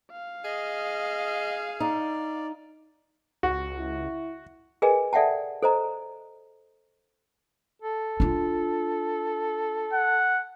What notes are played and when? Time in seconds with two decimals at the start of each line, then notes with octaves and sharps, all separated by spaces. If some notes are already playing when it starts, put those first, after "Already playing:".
0.12 F5
0.45 G#4 D#5
1.80 D#4 D5
3.43 C#2 F#4
3.79 E4
4.82 G#4 A#4 B4 D#5 G#5
5.13 A4 D5 E5 F#5 G5 A5
5.63 A4 C5 D#5 A#5
7.82 A4
8.20 D4 F4
9.93 F#5